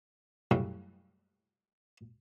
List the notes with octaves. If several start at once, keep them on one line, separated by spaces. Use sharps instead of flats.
F#2 A2 C#3 G3